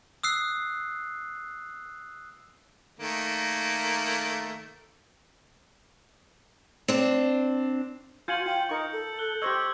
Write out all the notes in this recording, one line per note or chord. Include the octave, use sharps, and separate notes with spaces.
D#6 E6 F#6 C7
D#3 A3 A#3
C4 D4
F4 F#4 G#5 G6 C#7 F#7
F4 G5
D#4 A#4 C#6
A4
F#6 G7
G4 C5 D#5 C#6 E6 G#6